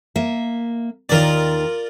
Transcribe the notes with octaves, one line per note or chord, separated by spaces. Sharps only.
A#3 E5
D#2 D#3 F4 A#4 D5